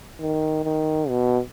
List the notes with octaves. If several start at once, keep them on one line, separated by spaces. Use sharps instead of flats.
D#3
D#3
B2